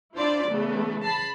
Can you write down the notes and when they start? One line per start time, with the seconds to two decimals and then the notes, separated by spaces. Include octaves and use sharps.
0.16 D4 E4 F4 C5 D5
0.50 C#3 E3 A3 B3
1.04 A5 B5 C7